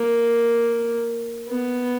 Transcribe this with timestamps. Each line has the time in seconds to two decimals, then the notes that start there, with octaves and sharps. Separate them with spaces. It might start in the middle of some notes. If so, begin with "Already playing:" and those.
Already playing: A#3
1.49 B3